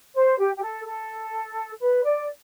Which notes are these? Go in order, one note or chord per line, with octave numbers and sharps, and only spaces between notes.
C5
G4
G4
A4
A4
B4
D5